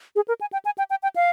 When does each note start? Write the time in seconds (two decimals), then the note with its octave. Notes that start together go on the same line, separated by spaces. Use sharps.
0.16 G#4
0.28 A#4
0.41 G#5
0.53 G5
0.65 G#5
0.78 G5
0.90 G5
1.03 G5
1.16 F5